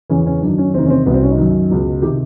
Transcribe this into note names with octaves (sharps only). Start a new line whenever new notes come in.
E2 C#3 E3 C#4
C#4
F#2 D#3 D4
C#4
E2 C3 D#3 C4
C#4
C4
C2 B2 B3
C4
C#4
D#4
F#2 D#3
C#2 B2
C3 D#3 G4